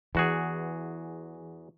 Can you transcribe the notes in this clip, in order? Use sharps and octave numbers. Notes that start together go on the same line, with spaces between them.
E2 E3 F#4 G#4